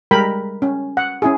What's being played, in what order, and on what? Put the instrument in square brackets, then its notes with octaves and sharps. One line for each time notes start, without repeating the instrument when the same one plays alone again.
[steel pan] G3 G#3 A#4 G5 B5
C#4
F#5
C#4 E4 G#4